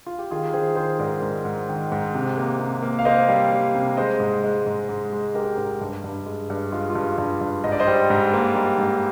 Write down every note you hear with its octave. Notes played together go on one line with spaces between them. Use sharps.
F4
G4
D#3 F4 G#4
D#3 G#4 C5
D#3 G#4 C5
G#2 A#4 D5
G#2
G#2
D#3
G#2
C3
A#3
C3
A#3
F5
A#3 C5 D#5
G3
G3
C3
G#3 C5 D#5
G#2
G#3
G#2
G#2
G#3
G#3 G4 A#4
G#2
G2
G2
G#3
G2
G#3 F4
F4
G2
G2
G2
G#2 D#5
D5
C5 D#5
G3
G#2
A#3
G3
G#2